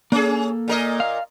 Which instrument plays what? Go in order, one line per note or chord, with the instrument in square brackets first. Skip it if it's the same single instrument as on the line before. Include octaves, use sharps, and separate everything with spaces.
[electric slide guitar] A#3 A4 [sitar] C#4 G#4
[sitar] A#2 A#4 D#5
[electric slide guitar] F5